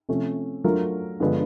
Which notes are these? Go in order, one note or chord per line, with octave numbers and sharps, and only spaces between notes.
C3 F3 A3 C#4
F#3 A3 D4 F4 A#4
G2 D3 F3 G#3 B3